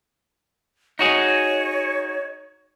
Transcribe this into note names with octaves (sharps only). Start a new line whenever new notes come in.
D#4 F#4 G#4 C#5